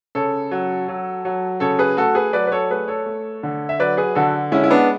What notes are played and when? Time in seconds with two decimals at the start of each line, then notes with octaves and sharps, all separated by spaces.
0.15 C#3 A4 C#5
0.51 F#3
0.89 F#3
1.25 F#3
1.60 C#3 A4 C#5
1.79 G#4 B4
1.97 A3 F#4 A4
2.15 G#4 B4
2.33 F#3 B4 D5
2.47 B4
2.52 A4 C#5
2.70 A3 G#4 B4
2.88 A4 C#5
3.06 A3
3.43 D3
3.69 E5
3.79 F#3 B4 D5
3.97 G#4 B4
4.15 D3 F#4 A4
4.52 G#3 C#4 E4
4.64 E4
4.71 B3 D4